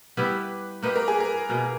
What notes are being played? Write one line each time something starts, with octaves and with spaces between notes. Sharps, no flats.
G3 B3 E4 G4 B4
A#3 D#4 G4 B4
A#4
G#4
A#4
B2 A#3 D#4